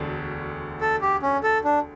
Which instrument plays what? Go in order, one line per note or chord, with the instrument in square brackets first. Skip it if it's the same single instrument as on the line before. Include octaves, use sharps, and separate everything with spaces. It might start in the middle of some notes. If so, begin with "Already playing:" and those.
Already playing: [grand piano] E1 D2 D3
[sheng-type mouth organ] A4
G4
C#4
A4
D4